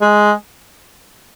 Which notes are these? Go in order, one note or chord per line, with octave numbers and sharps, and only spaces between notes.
G#3